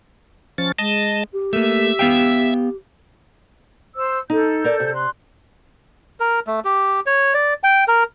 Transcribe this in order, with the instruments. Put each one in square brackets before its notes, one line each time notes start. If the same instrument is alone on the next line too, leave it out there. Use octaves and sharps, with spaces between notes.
[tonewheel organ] F3 C#4 A6
[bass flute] G#3 [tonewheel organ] D#5 A5
[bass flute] G4
[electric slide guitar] A3 A#3 [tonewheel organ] E5 E6
[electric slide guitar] B3 F5 G5
[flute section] C5 E6
[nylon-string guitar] D#4 [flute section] A4 G6
[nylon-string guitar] A#4 D5
C3
[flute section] C6 F#6
[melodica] A#4
A3
G4
C#5
D5
G5
A#4